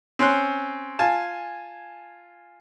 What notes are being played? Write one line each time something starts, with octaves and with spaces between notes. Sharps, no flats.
C4 C#4 C6 F#6
F4 G#5 A5